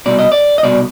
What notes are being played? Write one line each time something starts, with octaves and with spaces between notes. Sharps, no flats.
C2 B2 D5
D#5
D5
D#5
C2 B2 D5